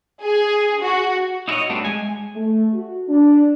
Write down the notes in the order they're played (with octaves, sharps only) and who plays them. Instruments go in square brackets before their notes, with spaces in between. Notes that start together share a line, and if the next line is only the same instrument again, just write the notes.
[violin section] G#4
F#4
[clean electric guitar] D#4 E4 F#4 G#4 C#5 D#5
G2 A3 B3 C4 D4
G#3 G#5
[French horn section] A3
F#4
D4